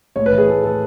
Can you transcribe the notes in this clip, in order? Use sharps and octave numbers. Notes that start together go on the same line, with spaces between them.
A2 C#5
B4
E3
G#4
A3 A4
A2 A4